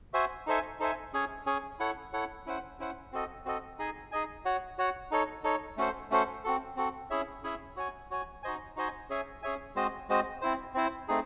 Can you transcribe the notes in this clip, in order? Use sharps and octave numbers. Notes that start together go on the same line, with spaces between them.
F#4 C5 E5 G#5
D#4 A4 C5 E5 G#5
D#4 A4 C5 E5 G#5
C#4 G#4 C#5 G#5
C#4 G#4 C#5 G#5
E4 A4 C#5 F#5
E4 A4 C#5 F#5
C#4 E4 C5 F#5
C#4 E4 C5 F#5
C4 F#4 A4 D#5
C4 F#4 A4 D#5
D#4 G#4 D#5 G#5
D#4 G#4 D#5 G#5
F#4 C#5 F#5
F#4 C#5 F#5
D#4 A4 C#5
D#4 A4 C#5
A3 C#4 F#4 A4 C5
A3 C#4 F#4 A4 C5
C4 F#4 A4
C4 F#4 A4
C#4 E4 G#4 C#5 E5
C#4 E4 G#4 C#5 E5
F#4 C#5 G#5
F#4 C#5 G#5
D#4 F#4 C5 D#5 G#5
D#4 F#4 C5 D#5 G#5
C#4 G#4 C#5 E5 G#5
C#4 G#4 C#5 E5 G#5
G#3 C4 F#4 C5 D#5
G#3 C4 F#4 C5 D#5
C4 E4 C5
C4 E4 C5
A3 C4 D#4 G#4